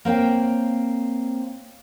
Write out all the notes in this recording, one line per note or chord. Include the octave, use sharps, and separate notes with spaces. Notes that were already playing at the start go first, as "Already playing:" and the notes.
A#3 C4 C#5 G5